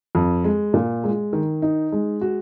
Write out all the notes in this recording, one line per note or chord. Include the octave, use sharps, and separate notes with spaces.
F2
G#3
A#2
G#3
D#3
D#4
G#3
F#4